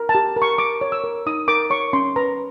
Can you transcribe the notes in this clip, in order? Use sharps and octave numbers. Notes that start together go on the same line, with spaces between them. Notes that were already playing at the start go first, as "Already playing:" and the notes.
Already playing: A#4
A5
G4
A#4
C#6
A#4 D6
C#5
E6
A#4
D#4 D#6
A#4 D6
C#5 C#6
C#4 C6
B4 A#5